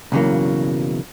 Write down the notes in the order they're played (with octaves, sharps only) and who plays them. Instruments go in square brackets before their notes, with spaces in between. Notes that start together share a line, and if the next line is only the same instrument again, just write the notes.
[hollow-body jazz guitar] B1 G2 C#3 E3 F#3 A#3